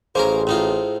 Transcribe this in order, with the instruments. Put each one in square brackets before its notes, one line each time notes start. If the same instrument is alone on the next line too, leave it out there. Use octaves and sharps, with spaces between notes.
[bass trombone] A1 [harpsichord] A#3 C#4 A#4 [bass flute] G#4 [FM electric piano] C5
[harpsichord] A2 D#4 F4